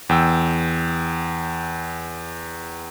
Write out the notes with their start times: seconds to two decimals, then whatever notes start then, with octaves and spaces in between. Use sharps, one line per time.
0.09 E2 G5 E6